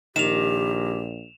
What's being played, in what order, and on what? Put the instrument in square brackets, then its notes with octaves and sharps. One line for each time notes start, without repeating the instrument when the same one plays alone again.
[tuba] A#1 [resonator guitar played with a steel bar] D#3 [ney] G4 [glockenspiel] E7 F7